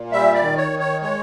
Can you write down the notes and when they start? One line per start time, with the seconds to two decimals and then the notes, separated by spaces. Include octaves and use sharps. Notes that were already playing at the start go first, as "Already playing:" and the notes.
Already playing: A#2
0.12 G3 E5
0.35 D5
0.42 D#3
0.57 C#5
0.72 D#3
0.79 C#5
1.02 G#3 C#5